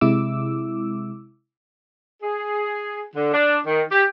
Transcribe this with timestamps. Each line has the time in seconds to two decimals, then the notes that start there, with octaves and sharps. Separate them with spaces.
0.01 C3 G#3 E4 D6 E6
2.23 G#4
3.16 D3
3.34 D4
3.66 D#3
3.91 G4